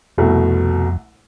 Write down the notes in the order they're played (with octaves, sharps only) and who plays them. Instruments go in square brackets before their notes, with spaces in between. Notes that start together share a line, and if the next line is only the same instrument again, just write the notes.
[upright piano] C2 B2 A3 [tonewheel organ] F2